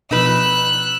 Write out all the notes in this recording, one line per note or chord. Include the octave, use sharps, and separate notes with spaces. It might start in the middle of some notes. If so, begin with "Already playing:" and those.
B2 F3 D#4 B4 E6 F#6